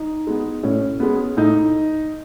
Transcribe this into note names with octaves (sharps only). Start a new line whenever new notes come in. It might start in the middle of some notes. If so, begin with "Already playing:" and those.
Already playing: D#4
G#3 B3
A2 C#4
G#3 B3
A2 D#4